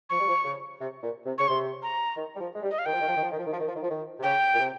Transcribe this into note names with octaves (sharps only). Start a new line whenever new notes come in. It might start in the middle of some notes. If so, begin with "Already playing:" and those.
F3 C#6
G3
F3
C#3
C3
A#2
C3
C#3 C#6
C3 C6
A#5
D#3
G3
F3
G#3
G3
D#5
F5
D#3 G5
F3
D#3
F3
D#3
F3
D#3
F3
D#3
F3
D#3
F3
D#3
F3
D#3
C3
C#3 G5
A#2
C3